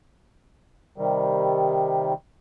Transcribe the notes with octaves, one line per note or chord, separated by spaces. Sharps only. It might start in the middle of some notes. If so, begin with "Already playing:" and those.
C3 D#3 G3